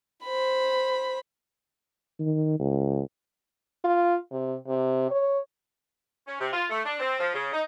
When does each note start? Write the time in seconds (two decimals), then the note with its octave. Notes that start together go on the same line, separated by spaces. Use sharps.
0.24 C5 B5
2.20 D#3
2.59 C#2
3.84 F4
4.32 C3
4.68 C3
5.11 C#5
6.27 C#4
6.40 C3
6.53 F4
6.70 A3
6.85 D4
7.00 C4
7.20 F3
7.34 C#3
7.53 D#4